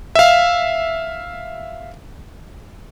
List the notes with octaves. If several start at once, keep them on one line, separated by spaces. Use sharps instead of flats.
E5 F5